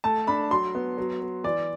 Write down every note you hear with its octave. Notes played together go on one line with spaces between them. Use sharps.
A3 A5
D4 B5
F#3 C6
B3
F#3
B3
E3 D5